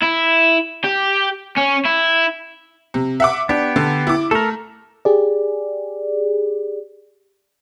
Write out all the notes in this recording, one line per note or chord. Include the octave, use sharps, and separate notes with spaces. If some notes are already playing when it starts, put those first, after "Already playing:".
E4
G4
C#4
E4
C3
E5 F#5 D6
B3 D4 G4
D3
E4 D6
A3 A4 A#4
G4 G#4 D5